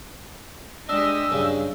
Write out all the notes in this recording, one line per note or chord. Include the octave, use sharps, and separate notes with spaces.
G#3 D4 G4 D#5 E6
G2 C#3 F#3